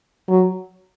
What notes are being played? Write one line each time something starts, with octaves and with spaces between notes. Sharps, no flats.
F#3